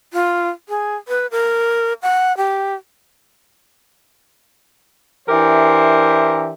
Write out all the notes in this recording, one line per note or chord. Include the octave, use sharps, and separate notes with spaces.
F4
G#4
B4
A#4
F#5
G4
E3 D4 G4 A#4 C5 E5